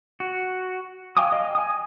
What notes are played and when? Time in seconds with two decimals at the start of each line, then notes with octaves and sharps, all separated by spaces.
0.20 F#4
1.17 F5 G5 G#5 D6 D#6
1.32 D#5 F5
1.55 G#5 D#6